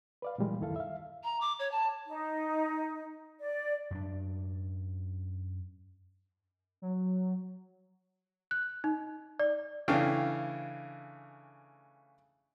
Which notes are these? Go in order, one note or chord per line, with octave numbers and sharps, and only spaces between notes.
B4 D5 F5
A#2 E3 G3 G#3 A#3
C#2 F#2 D#3 E4 A4 F5
E5 F5
A#5
D6
C#5
A5
D#4
D5
F#2 D4
F#3
F#6
D#4
D5
C#3 E3 A3 D4 F5 G5